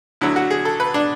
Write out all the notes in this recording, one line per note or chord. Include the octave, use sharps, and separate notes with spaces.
D2 D3 F#3 E4
F#4
G#4
A4
B4
D4